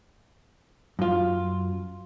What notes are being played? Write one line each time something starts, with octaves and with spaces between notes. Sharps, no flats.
F#2 F4